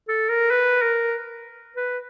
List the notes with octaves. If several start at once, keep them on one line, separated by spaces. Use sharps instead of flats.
A4
A#4
B4
A#4
B4